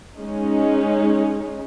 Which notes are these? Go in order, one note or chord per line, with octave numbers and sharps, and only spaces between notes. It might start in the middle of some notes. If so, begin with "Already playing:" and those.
G#3 C#4 D#4